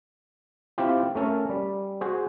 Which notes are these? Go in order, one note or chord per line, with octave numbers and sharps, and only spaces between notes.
C4 E4 F4 G4
A3 C#4 A4 A#4
G3
F#4 G#4 C5